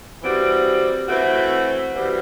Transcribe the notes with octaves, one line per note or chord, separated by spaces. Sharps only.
E3 G3 C4 F#4
E3 A3 C4 F#4
E3 G3 C4 F#4